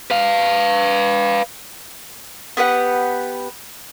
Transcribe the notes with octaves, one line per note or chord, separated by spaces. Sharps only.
B4 F5
B3 G4 B4 F#5